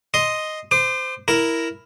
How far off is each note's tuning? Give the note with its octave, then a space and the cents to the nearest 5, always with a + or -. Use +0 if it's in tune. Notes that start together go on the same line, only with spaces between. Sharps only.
D#5 +0 C6 +0
C5 -20 D6 +35
E4 +0 A#4 +0